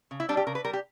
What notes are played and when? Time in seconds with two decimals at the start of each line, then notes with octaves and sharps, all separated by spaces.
0.11 C#3
0.20 E4
0.29 G3 D4
0.37 G4
0.47 C#3 A#4
0.55 B4
0.64 G3 A#4
0.73 G4